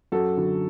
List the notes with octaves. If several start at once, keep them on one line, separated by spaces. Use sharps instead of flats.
F#2 F#4 A4
D3 F#3